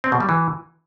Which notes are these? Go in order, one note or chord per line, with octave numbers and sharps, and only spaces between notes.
C4
B2
G3
E3